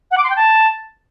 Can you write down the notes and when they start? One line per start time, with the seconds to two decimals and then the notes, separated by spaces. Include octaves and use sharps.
0.11 F#5
0.17 D6
0.23 C6
0.29 G5
0.36 A5